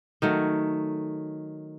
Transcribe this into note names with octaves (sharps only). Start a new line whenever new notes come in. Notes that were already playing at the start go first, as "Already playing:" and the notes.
D#3 F#3 A3